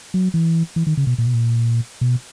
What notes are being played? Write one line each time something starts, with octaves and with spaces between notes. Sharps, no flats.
F#3
E3
E3
D#3
C#3
B2
A#2
B2
A#2
B2